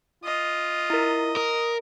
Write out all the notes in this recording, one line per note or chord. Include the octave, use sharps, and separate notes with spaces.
F4 D#5
E4 A#4
A#4 D#6